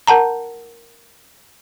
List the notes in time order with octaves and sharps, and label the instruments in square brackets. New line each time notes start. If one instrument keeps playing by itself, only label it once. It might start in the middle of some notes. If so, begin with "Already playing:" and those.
[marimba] A#4 F#5 A5 A#5